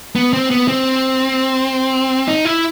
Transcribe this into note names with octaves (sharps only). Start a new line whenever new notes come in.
B3
C4
B3
C4
D#4
E4